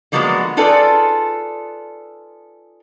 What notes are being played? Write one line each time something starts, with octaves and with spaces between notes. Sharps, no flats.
D3 F3 F#3 G#3 A#3 B3
D#4 F4 G#4 A4 B4 D5